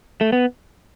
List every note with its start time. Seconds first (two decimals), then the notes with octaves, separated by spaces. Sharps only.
0.21 A3
0.33 B3